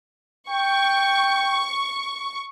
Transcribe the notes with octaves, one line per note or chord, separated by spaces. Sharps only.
G5 C#6